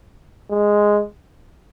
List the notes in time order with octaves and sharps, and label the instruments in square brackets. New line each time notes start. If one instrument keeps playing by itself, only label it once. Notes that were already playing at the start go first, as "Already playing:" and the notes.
[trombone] G#3